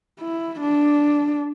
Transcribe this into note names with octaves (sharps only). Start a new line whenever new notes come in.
E4
D4